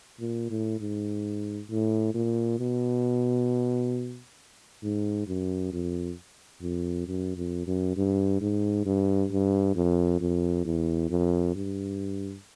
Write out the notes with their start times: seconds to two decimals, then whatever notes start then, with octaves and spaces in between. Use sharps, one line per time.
0.20 A#2
0.50 A2
0.80 G#2
1.70 A2
2.14 A#2
2.59 B2
4.83 G#2
5.27 F#2
5.72 F2
6.62 F2
7.07 F#2
7.36 F2
7.66 F#2
7.96 G2
8.41 G#2
8.85 G2
9.31 G2
9.75 F2
10.20 F2
10.65 E2
11.10 F2
11.55 G2